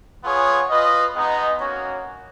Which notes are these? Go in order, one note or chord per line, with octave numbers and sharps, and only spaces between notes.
B3 F4 G#4 C#5
F4 B4 D#5
G#3 B3 D#4
A#3 C#4 F#4 C#5